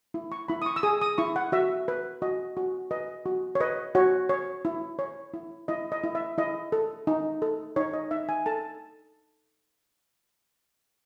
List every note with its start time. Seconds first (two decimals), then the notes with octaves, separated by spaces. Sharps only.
0.14 E4
0.32 C#6
0.48 E4 B5
0.62 D#6
0.66 C#6
0.76 E6
0.83 G#4 D#6
1.02 D#6
1.18 E4 C#6
1.36 F#5
1.52 F#4 E5
1.88 B4
2.22 F#4 D#5
2.57 F#4
2.91 B4 D#5
3.26 F#4
3.55 C#5
3.61 B4 D#5
3.95 F#4 C#5
4.29 C#5
4.65 E4
4.99 C#5
5.34 E4
5.68 E4 D#5
5.92 D#5
6.04 E4
6.15 E5
6.38 E4 D#5
6.72 A4
7.07 D#4
7.42 A4
7.76 D#4 C#5
7.93 D#5
8.11 D#4 E5
8.29 G#5
8.46 A4 A5